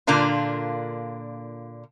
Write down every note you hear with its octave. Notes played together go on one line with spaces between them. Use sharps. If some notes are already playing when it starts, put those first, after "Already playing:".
A#2 D3 A#3 D4 F4